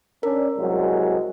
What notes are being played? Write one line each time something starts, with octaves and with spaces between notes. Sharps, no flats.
C#4 D4 A#4
C2 F#3 G#3